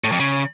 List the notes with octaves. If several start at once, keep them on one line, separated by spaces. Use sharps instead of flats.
A2
F2
C#3